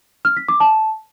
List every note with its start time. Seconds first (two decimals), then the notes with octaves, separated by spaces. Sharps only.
0.25 F6
0.37 B6
0.48 D6
0.60 A5